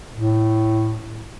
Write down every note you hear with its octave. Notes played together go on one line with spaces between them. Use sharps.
A2